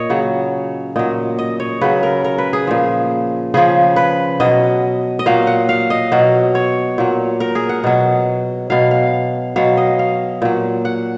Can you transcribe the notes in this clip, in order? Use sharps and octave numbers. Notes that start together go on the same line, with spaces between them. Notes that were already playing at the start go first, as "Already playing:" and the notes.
Already playing: A#2 C#5 D#5
C#3 F#3
A#2 F#3 D#5
D#5
C#5
C#3 F#3 B4
A#4
A#4
B4
G#4
A#2 F3
C#3 F3 G#4
B4
B2 F#3 D#5
D#5
A#2 F#3 F5
F#5
F5
D#5
B2 F#3
C#5
A#2 F#3
A#4
G#4
F#5
B2 F#3
B2 F#3 F5
F5
B2 F#3 F5
D#5
F5
A#2 F#3
F#5